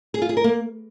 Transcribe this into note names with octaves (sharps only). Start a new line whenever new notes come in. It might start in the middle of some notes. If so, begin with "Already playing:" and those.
G#4
F4
G#4
A#4
A#3